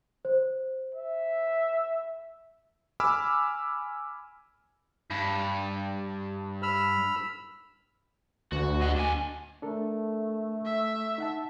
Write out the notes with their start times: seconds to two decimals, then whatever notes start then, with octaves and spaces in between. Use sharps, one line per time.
0.25 C5
0.94 E5
3.00 G#5 B5 D6 E6 F6
5.11 G2
6.63 B5 E6 F6
8.52 D2 F#4
8.81 D#5 F#5
8.96 D4 G#5
9.62 A3 D4 A4 A#4
10.65 E5
11.18 D#4 F#5 A5